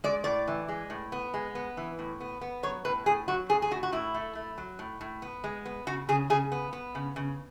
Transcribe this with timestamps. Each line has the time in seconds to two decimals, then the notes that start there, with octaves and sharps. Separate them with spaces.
0.04 G#3 D5
0.24 A2 D5
0.48 E3
0.68 G#3
0.90 A2
1.12 B3
1.34 G#3
1.55 B3
1.77 E3
1.99 A2
2.20 B3
2.41 B3
2.63 F#3 C#5
2.85 A2 B4
3.06 A2 G#4
3.28 F#3 F#4
3.49 A2 G#4
3.62 G#4
3.71 A2 F#4
3.83 F#4
3.92 A2 E4
4.14 A3
4.35 A3
4.58 F#3
4.79 A2
5.01 A2
5.22 B3
5.44 G#3
5.66 B3
5.87 C#3 F#4
6.09 C#3 G#4
6.30 C#3 G#4
6.52 B3
6.73 B3
6.95 C#3
7.16 C#3